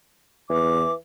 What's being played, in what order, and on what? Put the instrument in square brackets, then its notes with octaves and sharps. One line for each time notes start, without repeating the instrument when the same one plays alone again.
[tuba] E2 [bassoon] E3 [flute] D6